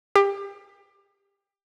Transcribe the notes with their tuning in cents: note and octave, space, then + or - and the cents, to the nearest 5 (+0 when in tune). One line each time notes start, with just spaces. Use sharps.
G4 +25